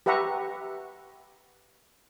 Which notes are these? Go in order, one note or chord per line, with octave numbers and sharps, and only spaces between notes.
G4 B4 E5 F#5 A#5 C#6